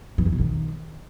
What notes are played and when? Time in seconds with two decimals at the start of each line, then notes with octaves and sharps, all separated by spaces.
0.18 E3
0.25 E2
0.32 B2
0.40 D#3